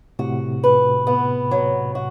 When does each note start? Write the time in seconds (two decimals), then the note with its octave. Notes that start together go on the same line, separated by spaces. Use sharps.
0.19 A2 C3 F#4
0.64 B4
1.07 B3
1.51 F#3
1.95 F#4